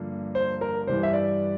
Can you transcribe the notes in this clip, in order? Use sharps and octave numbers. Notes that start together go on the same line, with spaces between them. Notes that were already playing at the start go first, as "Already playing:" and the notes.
Already playing: G2 D3 F3 A#3
C5
A#4
G2 E3 G3 C5
E5
D5